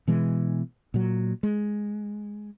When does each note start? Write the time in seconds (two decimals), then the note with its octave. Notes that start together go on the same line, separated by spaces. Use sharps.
0.08 B2 E3 G#3
0.94 A#2 F#3
1.43 G#3